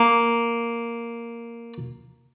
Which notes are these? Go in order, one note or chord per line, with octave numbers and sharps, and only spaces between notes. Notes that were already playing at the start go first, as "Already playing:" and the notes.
Already playing: A#3